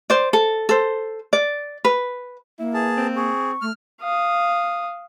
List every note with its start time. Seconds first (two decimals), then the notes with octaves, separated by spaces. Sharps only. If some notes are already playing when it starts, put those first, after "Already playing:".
0.10 C5 D5
0.33 A4
0.69 A4 C5
1.33 D5
1.85 B4
2.59 A#3 E4
2.74 G#4 B4 A5
2.97 C4
3.16 G#4 C#6
3.61 A3 F6
4.01 F5 D#6